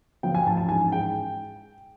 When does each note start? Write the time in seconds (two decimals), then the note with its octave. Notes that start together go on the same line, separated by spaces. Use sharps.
0.23 F3 G5
0.35 G#5
0.46 A1 A5
0.57 A5
0.69 G#2 G#5
0.91 G#3 G5